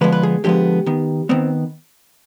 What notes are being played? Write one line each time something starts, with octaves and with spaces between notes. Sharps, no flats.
D3 F3 G#3 B3 B4
B4
G#4
D3 F3 G#3 B3 G4
D#3 B3
D#3 B3 C4